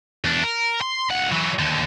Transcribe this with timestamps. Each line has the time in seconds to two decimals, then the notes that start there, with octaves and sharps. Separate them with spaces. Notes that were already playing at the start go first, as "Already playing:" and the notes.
0.25 E2 D4
0.43 A#4
0.81 C6
1.10 C#2 F#5
1.32 E3 F#3
1.59 D#2 D3